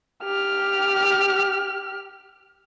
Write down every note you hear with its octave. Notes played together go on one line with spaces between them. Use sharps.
G4 F6